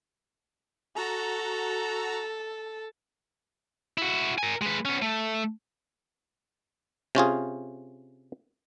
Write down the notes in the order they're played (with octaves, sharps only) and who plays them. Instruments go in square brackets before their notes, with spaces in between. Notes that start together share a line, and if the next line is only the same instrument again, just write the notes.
[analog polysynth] F#4 A#5 [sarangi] A4
[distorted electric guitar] E4 F#4
A#4 G#5
G#3 B4
B3 C#4
A3
[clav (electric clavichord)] C3 C#4 F4 G#4